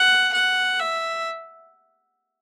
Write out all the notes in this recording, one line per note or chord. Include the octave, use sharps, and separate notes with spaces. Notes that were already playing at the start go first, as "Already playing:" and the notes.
Already playing: F#5
F#5
E5